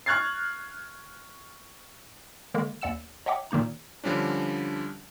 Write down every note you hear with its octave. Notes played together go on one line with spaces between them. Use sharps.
C#6 F6 F#6 G#6 A6 C7
D3 D#3 G#3 A#3
D#2 D5 F#5 E6 E7
C#5 D#5 E5 F#5 G5 D6
A#2 D#3 A#3 D#4 A#5
D3 F3 G3 C#4 D4